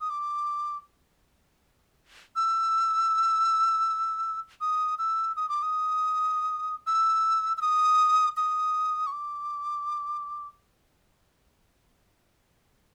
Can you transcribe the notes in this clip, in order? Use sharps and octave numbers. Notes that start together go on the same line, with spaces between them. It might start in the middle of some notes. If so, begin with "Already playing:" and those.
D#6
D6
E6
D#6
E6
D#6
D6
D#6
E6
E6
D#6
D#6
C#6
D6